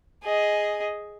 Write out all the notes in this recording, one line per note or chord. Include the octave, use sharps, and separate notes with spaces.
G#4 D#5